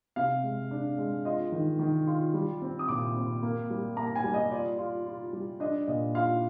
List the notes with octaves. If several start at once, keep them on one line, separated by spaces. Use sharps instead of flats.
C3 F5
G#3
D4
G#3
F4 D#5
D#3
D#3
F4
G3
C4
D#6
A#2 D6
C4
A#3
G3
A#3 A#5
G#5
G3
D#5
F4 D5
F4
F4
G3
D4 D#5
A#2 D#5
F4 F5